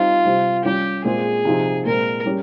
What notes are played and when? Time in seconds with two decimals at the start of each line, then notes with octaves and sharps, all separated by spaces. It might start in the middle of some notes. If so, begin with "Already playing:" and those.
Already playing: G3 C4 D#4 F4
0.25 C3 G3 C4
0.65 G3 C#4 F4 G4
1.04 A#2 G#3 C4 F4 G#4
1.45 C3 F3 C4 D#4
1.85 A#2 G#3 C4 A#4
2.26 G3 C#4